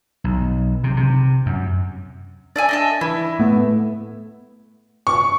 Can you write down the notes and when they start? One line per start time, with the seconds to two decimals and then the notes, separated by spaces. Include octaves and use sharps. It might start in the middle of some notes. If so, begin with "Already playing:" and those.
0.24 B1
0.84 C3
0.97 C3
1.46 F#2
2.56 D4 D5 E5 G#5
2.69 D#5 E5 A5
3.01 E3 E4
3.39 A2 A3 B3
5.07 C#6